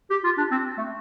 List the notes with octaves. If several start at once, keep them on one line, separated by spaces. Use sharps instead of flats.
G4
F4
D4
C4
A3